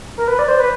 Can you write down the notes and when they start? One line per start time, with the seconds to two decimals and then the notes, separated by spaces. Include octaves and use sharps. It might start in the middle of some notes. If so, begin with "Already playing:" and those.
0.18 A#4
0.28 B4
0.39 D5
0.48 C5
0.59 B4